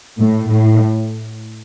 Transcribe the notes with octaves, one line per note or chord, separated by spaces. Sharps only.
A2
A2